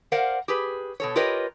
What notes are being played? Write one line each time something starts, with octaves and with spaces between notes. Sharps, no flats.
A#4 C5 D5 F5 F#5
G4 G#4 B4
B2 A4 C#5
F4 G4 A#4 B4 C#5 D#5